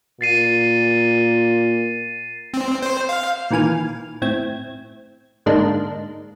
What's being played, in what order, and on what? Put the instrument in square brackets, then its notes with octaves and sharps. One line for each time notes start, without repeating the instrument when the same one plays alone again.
[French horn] A#2 [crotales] A6 C7 D#7
[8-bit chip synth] C4
C5
F5
[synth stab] A#2 D#3 E3 G#5 F6
A2 C4 G#6
G#2 D3 G#3 A#3 D4 D#4